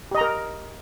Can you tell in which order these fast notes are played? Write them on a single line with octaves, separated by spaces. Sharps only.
G4 D#5 A#5 A#4